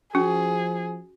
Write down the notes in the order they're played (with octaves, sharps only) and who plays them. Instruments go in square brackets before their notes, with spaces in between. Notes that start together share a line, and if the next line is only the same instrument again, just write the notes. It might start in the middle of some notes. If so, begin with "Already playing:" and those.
[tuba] F3 [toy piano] C#4 [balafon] F#4 [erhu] G#4